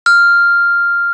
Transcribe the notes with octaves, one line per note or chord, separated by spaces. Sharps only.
F6